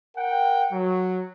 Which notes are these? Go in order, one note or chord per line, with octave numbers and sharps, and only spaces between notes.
A#4 F#5 G5
F#3